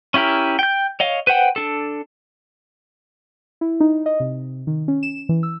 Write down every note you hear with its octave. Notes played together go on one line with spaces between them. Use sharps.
C#4 E4 G4 A#4
G5 G6
C#5 D#5 F5
B4 C5 F#5 G5
D4 A4
E4
D#4
D#5
C3
D#3
C#4
E7
E3
E6